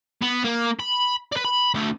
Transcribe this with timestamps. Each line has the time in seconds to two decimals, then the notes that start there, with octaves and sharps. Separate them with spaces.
0.22 B3
0.44 A#3
0.79 B5
1.32 B4 D5
1.44 B5
1.75 D3 A3